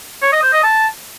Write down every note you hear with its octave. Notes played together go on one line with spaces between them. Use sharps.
C#5
D#5
C5
D#5
A5